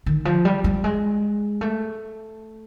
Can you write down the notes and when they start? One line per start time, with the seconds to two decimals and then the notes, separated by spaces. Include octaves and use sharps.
0.06 D#3
0.25 F3
0.45 G3
0.64 G3
0.84 G#3
1.61 A3